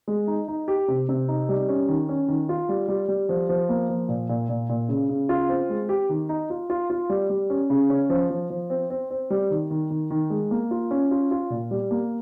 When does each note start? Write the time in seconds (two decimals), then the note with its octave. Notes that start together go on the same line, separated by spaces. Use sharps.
0.08 G#3
0.27 D#4
0.48 D#4
0.68 G4
0.88 C3
1.09 C3
1.28 D#4
1.49 G3
1.69 C#4
1.89 D#3
2.09 C#4
2.28 D#3
2.49 F4
2.69 G3
2.88 G3
3.08 G3
3.29 F3
3.49 F3
3.69 A#3
3.89 F3
4.09 A#2
4.29 A#2
4.49 A#2
4.69 A#2
4.89 C#3
5.09 C#3
5.29 F4
5.49 C4
5.70 G#3
5.89 G4
6.09 D#3
6.29 D#4
6.50 F4
6.70 F4
6.90 F4
7.09 G3
7.30 G3
7.50 C#4
7.70 C#3
7.90 C#4
8.10 F3
8.30 F3
8.50 F3
8.70 C4
8.90 C4
9.10 C4
9.30 G3
9.51 D#3
9.70 D#3
9.90 D#3
10.11 D#3
10.30 G#3
10.51 A#3
10.71 F4
10.91 C#4
11.11 F4
11.31 F4
11.50 A#2
11.71 G3
11.91 A#3